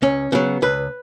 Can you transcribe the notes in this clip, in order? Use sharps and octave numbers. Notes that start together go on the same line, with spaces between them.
C#2 C#4
C#3 F#3 B3
C#2 B4